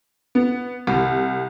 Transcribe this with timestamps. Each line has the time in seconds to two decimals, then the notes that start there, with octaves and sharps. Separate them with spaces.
0.35 B3
0.87 C2